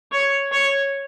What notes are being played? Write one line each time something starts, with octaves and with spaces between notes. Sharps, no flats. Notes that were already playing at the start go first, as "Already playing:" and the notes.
C#5
C#5